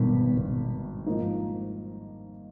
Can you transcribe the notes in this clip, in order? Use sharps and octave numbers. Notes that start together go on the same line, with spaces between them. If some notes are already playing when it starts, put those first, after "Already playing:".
Already playing: G#1 G2 B2 D#3
G#2 F3 A#3 D#4